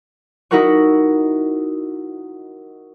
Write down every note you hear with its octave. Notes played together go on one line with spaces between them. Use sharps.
D#4 E4 F#4 A#4 F#5 C#6